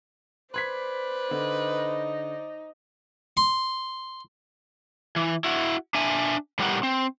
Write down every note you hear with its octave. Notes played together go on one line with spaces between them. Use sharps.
B4 C5 D5 C6 G#6 B6
D3 D#4
C6
E3
E4 F#4
D4 E5 G#5
A2 G3 B3 G4 A#4 F#5
C4